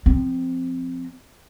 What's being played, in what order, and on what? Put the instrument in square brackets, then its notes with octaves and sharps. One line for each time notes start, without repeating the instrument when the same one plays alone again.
[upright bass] F3 C4